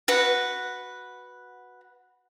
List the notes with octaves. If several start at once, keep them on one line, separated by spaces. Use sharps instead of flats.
F#4 B4 F#5